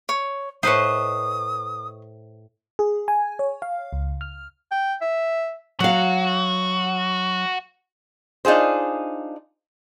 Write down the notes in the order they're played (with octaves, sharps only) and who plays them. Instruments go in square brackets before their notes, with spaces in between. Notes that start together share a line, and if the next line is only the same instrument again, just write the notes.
[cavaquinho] C#5
[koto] A2 B4 C5 [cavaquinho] D#5 C#6 [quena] D#6
[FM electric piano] G#4
G#5
C#5
F5
C#2
F6
[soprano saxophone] G5
E5
[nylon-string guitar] F#3 F5 [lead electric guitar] F#4
[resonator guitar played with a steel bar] D4 D#4 F4 G#4 C5